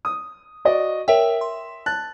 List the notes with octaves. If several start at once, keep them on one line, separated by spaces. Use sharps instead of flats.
D#6
F#4 D5 D#5
A#4 C#5 E5 G5
C6
A5 F#6 A6